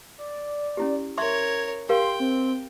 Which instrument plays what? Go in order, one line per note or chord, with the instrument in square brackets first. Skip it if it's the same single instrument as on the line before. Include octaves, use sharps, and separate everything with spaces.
[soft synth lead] D5
[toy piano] C#4 E4 G4
[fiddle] A#4 C#5 [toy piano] E5 C6 C#6 [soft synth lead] G#6
[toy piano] G4 A#4 F5 [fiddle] G5 [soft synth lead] C6
[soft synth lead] C4